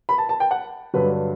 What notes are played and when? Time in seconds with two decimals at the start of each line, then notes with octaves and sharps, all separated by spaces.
0.09 B5
0.18 A5
0.29 A5
0.40 G5
0.51 F#5
0.94 G2 D3 F#3 B4